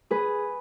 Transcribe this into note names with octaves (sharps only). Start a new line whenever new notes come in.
G#4 B4